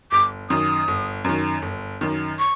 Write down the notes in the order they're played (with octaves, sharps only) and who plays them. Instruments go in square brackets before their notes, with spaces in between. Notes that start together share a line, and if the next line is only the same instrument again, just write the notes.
[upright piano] G1 [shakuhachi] D6
[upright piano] F#2 D#3 [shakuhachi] D#6
[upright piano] G1
F#2 D#3
G1
F#2 D#3
[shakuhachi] C#6